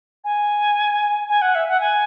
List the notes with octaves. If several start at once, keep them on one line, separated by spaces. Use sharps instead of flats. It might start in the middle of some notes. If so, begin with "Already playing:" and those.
G#5
G#5
F#5
E5
F#5
G#5